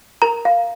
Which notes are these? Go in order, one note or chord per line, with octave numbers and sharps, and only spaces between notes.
A#4 A#5
F5